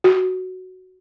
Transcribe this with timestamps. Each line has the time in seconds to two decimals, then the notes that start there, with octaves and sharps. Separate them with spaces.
0.04 F#4